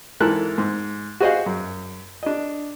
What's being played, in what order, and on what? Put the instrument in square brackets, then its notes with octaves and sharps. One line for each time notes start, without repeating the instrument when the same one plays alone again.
[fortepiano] G#2 E3 A4 A#4 F#6
G#2
F#4 G#4 C5 D#5 F5 F#5
F#2
D4 D#5